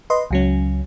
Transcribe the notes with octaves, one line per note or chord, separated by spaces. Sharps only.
B4 D#5 C6
C#2 F#3 C#4